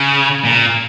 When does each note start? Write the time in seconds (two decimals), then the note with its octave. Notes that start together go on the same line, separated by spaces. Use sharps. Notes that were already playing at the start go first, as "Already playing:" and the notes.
Already playing: C#3
0.45 A#2